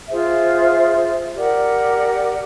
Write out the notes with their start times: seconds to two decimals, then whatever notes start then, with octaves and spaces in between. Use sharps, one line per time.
0.09 F4 G#4 C5 E5
1.35 G4 A#4 D5 F#5